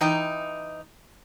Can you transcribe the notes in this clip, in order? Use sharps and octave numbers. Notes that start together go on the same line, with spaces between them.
E3 D#4 G5